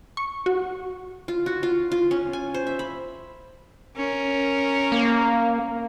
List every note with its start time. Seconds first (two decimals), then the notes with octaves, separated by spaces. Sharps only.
0.17 C#6
0.46 F#4
1.28 F4
1.46 F#4
1.63 F4
1.92 F4
2.11 C#4
2.33 G#5
2.54 C5
2.67 E5
2.79 B5
3.96 C#4 A#4
4.92 A#3